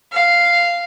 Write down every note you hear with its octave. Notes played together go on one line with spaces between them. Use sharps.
F5